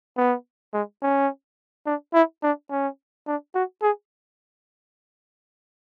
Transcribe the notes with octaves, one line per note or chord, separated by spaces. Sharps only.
B3
G#3
C#4
D4
E4
D4
C#4
D4
F#4
G#4